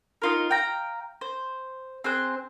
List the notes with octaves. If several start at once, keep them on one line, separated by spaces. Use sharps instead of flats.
D#4 F4 A#4
F5 G5 A#5
C5
C4 G#4 C5 F#6